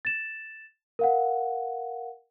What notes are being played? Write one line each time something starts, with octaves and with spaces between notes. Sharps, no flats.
A6 E7
A#4 F5 F#5